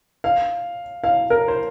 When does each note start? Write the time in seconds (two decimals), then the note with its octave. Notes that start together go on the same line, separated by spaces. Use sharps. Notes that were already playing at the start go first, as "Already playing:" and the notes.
0.24 F5
1.04 F5
1.30 A#4
1.48 C5